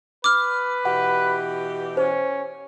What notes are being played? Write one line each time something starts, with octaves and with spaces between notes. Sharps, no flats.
B4 D6 F6
B2 E3 G4 F#5
C#4 C5